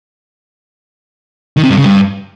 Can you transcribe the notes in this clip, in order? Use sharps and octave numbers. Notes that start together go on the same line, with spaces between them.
D#3
C3
G2
C#3
G2